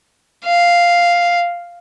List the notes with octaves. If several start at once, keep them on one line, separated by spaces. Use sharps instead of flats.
F5